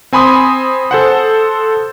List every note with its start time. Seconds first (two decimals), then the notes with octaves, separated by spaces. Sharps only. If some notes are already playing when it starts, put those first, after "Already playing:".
0.13 C4 G#5 B5 C6 D#6
0.91 A4 C5 F#5